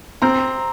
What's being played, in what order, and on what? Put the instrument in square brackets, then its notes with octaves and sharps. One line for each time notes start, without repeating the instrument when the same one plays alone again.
[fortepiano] C4 [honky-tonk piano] A#5